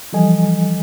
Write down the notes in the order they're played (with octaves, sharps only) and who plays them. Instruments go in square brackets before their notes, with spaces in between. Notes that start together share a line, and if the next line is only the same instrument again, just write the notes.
[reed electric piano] E3 F3 G3 A4 D#5 G#5